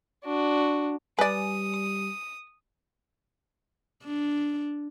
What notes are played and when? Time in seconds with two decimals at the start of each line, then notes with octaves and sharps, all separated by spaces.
0.24 D4 F#4
1.19 G3 B4 D5 G#5 D#6
4.04 D4